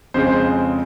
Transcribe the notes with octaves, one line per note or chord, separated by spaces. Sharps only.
F2 C#3 G#3 C5
C5